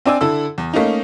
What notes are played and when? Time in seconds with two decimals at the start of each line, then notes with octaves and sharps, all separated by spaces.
0.06 C4 D4 D5 G#5 E6
0.21 D3 E4 A4 E6
0.58 E2
0.73 A3 A#3 C#4 D#4